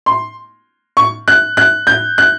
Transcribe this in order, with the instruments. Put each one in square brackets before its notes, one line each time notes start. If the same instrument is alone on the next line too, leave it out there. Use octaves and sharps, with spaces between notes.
[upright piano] C6
C#6
F#6
F#6
G6
F#6